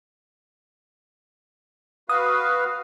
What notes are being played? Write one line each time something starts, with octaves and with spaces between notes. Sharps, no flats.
F#4 B4 F5 D#6